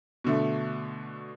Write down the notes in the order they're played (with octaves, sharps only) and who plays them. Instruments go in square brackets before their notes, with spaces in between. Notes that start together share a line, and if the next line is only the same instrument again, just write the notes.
[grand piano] B2 D3 A3